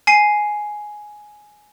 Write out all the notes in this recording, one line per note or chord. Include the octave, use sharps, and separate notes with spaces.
G#5 C7 D#7